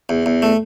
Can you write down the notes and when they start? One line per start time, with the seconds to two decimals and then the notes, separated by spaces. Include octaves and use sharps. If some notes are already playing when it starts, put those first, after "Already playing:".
0.09 E2
0.26 E2
0.42 A3